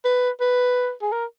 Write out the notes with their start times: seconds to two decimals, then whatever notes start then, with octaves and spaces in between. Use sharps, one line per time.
0.05 B4
0.40 B4
1.02 G#4
1.12 A#4